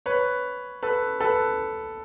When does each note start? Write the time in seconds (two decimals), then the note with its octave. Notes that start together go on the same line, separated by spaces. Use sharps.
0.06 B4 C#5
0.83 A4 B4
1.20 A4 B4